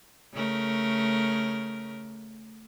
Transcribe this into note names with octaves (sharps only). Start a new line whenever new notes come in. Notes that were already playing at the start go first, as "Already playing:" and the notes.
C#3 A3 A#4